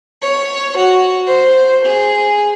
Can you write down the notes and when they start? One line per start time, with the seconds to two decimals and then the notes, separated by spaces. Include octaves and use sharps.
0.22 C#5
0.78 F#4
1.28 C5
1.86 G#4